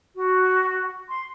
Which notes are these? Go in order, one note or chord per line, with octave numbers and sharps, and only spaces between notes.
F#4
C6